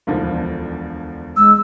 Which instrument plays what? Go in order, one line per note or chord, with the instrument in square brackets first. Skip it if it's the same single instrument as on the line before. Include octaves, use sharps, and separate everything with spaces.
[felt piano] E1 D2 F3
[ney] G#3 [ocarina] E6